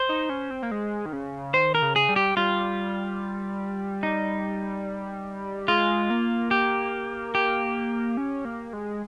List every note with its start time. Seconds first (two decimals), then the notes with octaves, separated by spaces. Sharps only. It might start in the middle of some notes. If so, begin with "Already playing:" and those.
Already playing: C5
0.09 D#4
0.29 C#4
0.51 C4
0.63 A#3
0.71 G#3
1.06 D#3
1.13 C#3
1.54 D#3 C5
1.75 A#4
1.82 C#3
1.96 G#4
2.09 G3
2.16 G4
2.37 G3 F4
4.03 D#4
5.68 G#3 F4
6.10 A#3
6.51 G4
7.35 G4
8.17 C#4
8.45 A#3
8.73 G#3